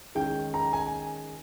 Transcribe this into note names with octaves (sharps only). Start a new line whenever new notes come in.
D#3 G#3 C#4 G5
A#5
G#5